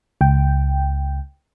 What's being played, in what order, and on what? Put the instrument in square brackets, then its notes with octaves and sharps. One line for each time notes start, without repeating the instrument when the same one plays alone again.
[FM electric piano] C#2 G5